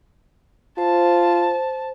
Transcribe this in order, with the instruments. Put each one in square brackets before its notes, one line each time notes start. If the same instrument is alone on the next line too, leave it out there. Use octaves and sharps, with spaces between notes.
[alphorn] F4 [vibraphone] C5 [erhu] A5